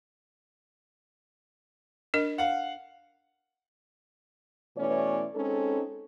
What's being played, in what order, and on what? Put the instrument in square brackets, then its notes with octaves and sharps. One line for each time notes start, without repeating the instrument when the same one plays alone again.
[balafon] D4 A#4 D#5
[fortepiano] F5 F#5
[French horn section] B2 E3 A3 C#4 C#5 D5
G#3 C4 C#4 D#4 A4